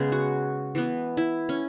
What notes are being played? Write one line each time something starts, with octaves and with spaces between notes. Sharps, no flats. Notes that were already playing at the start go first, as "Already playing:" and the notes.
Already playing: C#3 G#3 B3 G#4
F#4
E3 B3
E4
C#4